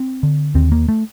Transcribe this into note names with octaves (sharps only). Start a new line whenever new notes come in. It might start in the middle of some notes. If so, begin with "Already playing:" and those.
Already playing: C4
D3
D#2 C4
A#3
A3